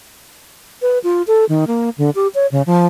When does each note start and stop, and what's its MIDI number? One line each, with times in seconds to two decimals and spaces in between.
0.82 0.99 71
1.04 1.22 65
1.27 1.45 69
1.49 1.65 51
1.67 1.90 58
1.98 2.10 50
2.15 2.27 67
2.35 2.47 73
2.52 2.62 49
2.66 2.87 53